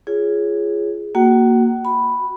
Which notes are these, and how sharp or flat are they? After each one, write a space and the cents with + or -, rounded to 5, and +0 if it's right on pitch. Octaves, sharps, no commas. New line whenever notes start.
F4 -25 G#4 +0 C#5 +0
A#3 +0 F#4 +0 F#5 +45
F#4 +0 B5 +0